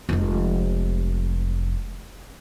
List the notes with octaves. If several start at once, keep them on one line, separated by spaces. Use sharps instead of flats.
F1 G#3